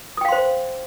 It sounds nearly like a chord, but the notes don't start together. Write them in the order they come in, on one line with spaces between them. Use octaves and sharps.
D#6 G5 F5 C6 C5